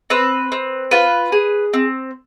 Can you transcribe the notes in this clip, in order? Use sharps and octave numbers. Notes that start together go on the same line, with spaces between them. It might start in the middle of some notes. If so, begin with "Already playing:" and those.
C4 B4
C4
F4 B4
G#4
C4